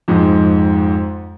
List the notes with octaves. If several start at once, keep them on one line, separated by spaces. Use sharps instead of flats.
F2 G#2